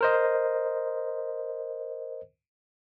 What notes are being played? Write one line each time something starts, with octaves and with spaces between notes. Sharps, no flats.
A#4 C5 D#5